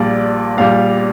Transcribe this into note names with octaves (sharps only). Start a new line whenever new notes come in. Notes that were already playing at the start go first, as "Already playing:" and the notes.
Already playing: A#1 A#2 G3 D5
A#1 A#2 G3 F5